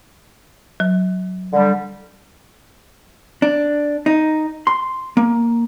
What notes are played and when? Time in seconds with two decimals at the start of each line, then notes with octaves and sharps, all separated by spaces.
0.80 F#3
1.53 D3 G3
3.42 D4
4.06 D#4
4.67 C6
5.17 A#3